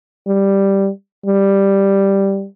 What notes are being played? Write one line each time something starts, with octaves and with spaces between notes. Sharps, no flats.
G3
G3